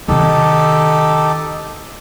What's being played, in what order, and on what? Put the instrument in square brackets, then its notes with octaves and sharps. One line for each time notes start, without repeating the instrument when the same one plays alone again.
[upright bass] C3 D#3 [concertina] D#4 G4 A4